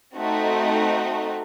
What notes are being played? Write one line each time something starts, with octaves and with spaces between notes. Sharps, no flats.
A3 C4 D#4 F#4